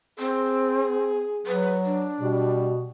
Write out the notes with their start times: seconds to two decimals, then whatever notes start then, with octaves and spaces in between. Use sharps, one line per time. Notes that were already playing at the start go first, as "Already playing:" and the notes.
0.19 C4 G#4
1.47 F#3 B4
1.85 D4
2.21 B2 G3